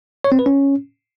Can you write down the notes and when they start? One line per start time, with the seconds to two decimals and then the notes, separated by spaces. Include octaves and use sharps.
0.24 C#5
0.32 C4
0.39 B4
0.46 C#4